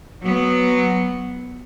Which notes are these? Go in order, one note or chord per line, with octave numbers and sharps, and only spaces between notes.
F#3 B3